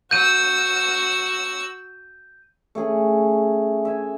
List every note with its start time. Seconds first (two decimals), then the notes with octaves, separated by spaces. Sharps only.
0.11 F#4 E6 G6 D#7
2.75 A3 C#4 G#4
3.85 E5 G#5